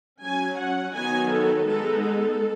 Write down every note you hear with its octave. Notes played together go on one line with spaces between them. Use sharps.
F#3 C#4 G#5
F#5
D#3 F#3 B3 D#4 G#5
A4
G#3 B3 D#4 A4
A4